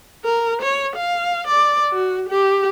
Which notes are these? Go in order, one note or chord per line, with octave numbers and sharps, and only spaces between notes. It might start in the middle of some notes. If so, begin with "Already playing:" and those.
A#4
C#5
F5
D5
F#4
G4